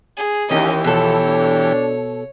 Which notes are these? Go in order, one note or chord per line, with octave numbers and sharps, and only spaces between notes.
G#4
D#2 E3 C#4 G4 D#5
E2 B2 F3 A4 C#5
D4